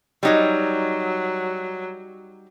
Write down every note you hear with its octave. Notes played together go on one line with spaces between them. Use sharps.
F#3 G3 D#4 C#5